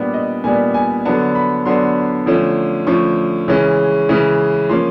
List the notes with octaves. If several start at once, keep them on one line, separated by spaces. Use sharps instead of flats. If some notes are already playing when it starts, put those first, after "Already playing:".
Already playing: A#2 G3 B3 D4 D5
D#5
A#2 G3 B3 D4 G#5
G#5
D3 F#3 B3 D4 A5
B5
D3 F#3 B3 D4 C6
D3 F3 A3 C#4
D3 F3 A3 C#4 C#6
C#3 E3 G#3 C#4
C#3 E3 G#3 C#4
F3 A#3 C#4 C6